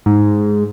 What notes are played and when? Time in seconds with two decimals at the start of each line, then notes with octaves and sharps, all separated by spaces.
0.06 G#2